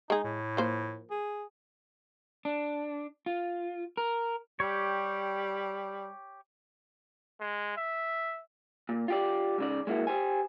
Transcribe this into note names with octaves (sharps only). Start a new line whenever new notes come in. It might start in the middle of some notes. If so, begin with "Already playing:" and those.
G#3 D#4 G#4
A2
F3 A#3 C5
G#4
D4
F4
A#4
G3 G4 C#5
G#3
E5
A#2
F4 G4 D5
G#2 C#3 D5
G#3 A#3 E4 F#4
G4 C5 G#5